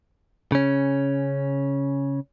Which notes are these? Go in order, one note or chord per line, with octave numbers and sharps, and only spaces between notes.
C#3 C#4